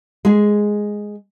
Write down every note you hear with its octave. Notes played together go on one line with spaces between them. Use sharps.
G#3 G#4